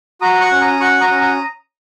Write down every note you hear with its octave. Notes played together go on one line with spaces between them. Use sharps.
F#4 A#5 D#6
C#6 F#6
C#4
A#5 D#6
F#4 C#6 F#6
A#5 D#6
C#4
A#5 D#6